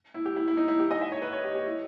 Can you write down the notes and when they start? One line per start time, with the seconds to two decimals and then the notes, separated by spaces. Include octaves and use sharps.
0.14 E4
0.25 G4
0.36 E4
0.48 E4
0.57 D#4
0.68 E4
0.80 G4
0.91 D#5
1.01 E5
1.12 C#5
1.22 B4
1.33 C#5
1.44 G4
1.55 G4
1.66 E4